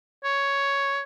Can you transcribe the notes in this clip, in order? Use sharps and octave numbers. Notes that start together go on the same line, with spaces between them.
C#5